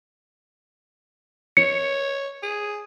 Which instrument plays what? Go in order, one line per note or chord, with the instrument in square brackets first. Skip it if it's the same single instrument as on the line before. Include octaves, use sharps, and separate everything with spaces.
[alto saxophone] C#5 [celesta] C#7
[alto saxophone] G#4